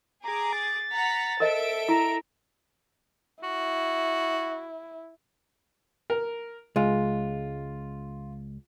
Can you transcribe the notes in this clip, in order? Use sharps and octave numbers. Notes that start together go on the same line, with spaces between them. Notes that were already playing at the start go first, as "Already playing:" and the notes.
G#4 A#5 D6
A6
F#5 A#5 B6
A4 A#4 C5 D#5 E5 D7
E4 A#5
E4 F#4
A#4
C#2 G#3 F4